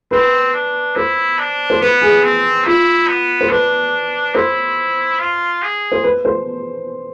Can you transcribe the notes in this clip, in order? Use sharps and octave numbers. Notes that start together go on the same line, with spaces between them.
C4 B4
D4
E4 C5
D4
C5
B3 B4
G#4
C4
E4 F4
B3
C5
D4 B4
E4 C5
F4
G#4
C5
B4
C5